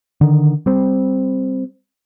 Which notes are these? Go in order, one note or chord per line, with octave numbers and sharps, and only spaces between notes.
D3 D#3
G3 C4